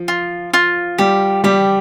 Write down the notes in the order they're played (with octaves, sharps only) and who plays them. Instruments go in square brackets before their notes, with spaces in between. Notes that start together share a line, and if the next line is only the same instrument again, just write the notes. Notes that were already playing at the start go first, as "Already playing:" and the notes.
Already playing: [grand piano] F3
[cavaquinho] F4
F4
[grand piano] G3 [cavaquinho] G4
[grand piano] G3 [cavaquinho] G4